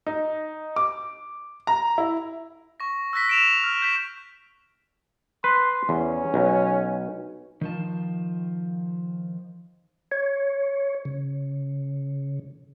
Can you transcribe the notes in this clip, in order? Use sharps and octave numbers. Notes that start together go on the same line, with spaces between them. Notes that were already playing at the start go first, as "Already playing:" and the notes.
D#4
D6
A#5
E4
C#6 A#6
E6 F#6 A#6 B6
D7 E7 F7
F6
G6 B6
B4 C6
E2 C#4
B1
D#3 F3 A5
C#5
C#3